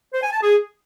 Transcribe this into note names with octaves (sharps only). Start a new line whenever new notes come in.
C5
G#5
A5
G#4